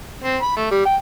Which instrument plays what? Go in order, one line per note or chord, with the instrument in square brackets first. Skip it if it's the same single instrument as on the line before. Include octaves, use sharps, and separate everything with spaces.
[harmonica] C4
B5
A3
G3
G5